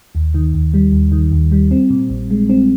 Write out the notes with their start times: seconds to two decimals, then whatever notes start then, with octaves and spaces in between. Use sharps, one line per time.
0.15 D#2
0.34 D#3
0.54 D#2
0.74 G3
0.92 D#2
1.12 D#3
1.32 D#2
1.52 G3
1.71 C4
1.90 A#2
2.10 A#1
2.31 G#3
2.49 C4